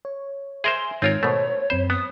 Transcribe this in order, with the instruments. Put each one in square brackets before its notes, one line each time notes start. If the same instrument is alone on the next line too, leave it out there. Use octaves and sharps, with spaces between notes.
[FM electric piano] C#5
[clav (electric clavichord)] G#4 A#4 C5 [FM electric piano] E5 G#5 [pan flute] C6
[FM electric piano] G#2 D#3 [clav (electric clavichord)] C4 F4 A#4 [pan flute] C#5
[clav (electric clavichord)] B2 A3 [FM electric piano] A#4 C5
[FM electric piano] F#2 C4 B5 [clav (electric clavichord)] C5
[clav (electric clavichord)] B3 [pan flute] D#6